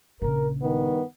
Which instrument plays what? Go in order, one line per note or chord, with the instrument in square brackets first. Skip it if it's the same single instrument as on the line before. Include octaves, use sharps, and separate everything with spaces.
[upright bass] A#1 C#3 [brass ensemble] A#4
[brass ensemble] G2 D#3 [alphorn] B3